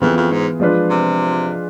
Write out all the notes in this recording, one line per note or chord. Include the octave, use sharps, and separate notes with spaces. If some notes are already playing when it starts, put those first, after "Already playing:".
F2 E3 B3 F4 G#4 B4
F2
G#2
F3 G#3 D4 F4 B4
C3